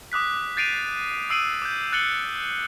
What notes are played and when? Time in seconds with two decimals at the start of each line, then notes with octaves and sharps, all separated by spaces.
0.12 D6 D#6 F#6 B6
0.57 G6 A6 C7 D7 D#7 F7
1.30 D#6 E6 C7 D7 D#7 F#7
1.62 D6 G6
1.92 F#6 A6 C#7 F#7 G7